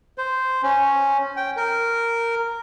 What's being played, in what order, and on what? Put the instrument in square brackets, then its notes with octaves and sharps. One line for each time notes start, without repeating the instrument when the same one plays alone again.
[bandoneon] C5
C#4
G5
A#4